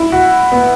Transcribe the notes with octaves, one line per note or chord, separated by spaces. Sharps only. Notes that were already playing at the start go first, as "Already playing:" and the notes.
Already playing: E4
F#4
B3